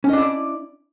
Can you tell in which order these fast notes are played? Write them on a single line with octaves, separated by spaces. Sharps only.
C#4 D#5 D4 E4 D5